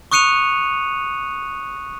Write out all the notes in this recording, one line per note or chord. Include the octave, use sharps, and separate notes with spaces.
C#6 D#6 F#6 C#7 D#7 F7